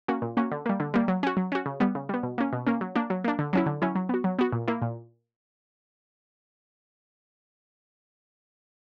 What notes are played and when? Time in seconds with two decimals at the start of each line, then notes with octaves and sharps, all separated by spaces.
0.08 A#3 C#4 F#4
0.22 A#2
0.37 A#3 C#4 F#4
0.51 D3
0.66 G3 A#3
0.80 D3
0.94 G3 A#3
1.08 F#3
1.23 C#4 F#4
1.37 F#3
1.52 C#4 F#4
1.66 C#3
1.80 G3 B3
1.95 C#3
2.09 G3 B3
2.23 B2
2.38 A#3 C#4
2.53 B2
2.67 A#3 C#4
2.81 F#3
2.96 A#3 D4
3.10 F#3
3.24 A#3 D4
3.39 D3
3.53 F#3 C#4 E4
3.66 D3
3.82 F#3 C#4 E4
3.95 F#3
4.09 B3 F#4
4.24 F#3
4.39 B3 F#4
4.52 A#2
4.68 A#3 E4
4.82 A#2